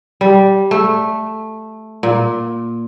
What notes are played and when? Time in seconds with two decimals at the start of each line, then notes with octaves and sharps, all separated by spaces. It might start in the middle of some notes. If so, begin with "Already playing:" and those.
0.21 G3
0.71 A3
2.03 A#2